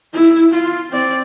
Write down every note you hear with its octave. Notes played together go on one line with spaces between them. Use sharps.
E4
F4
C4 D5